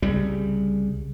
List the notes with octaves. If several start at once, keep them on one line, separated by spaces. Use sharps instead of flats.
C2 C#3 G3